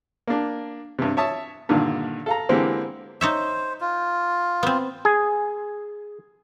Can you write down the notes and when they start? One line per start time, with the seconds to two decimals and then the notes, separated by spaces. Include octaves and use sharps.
0.28 A#3 D4
0.99 G2 C3
1.17 C#5 E5 A5 D#6
1.69 G2 A#2 D3 D#3
2.26 A4 F5 A#5
2.49 D3 E3 G#3 A#3 C4 G4
3.21 D#4 C5 C#5 E5
3.81 F4
4.63 B3 C4
5.05 G#4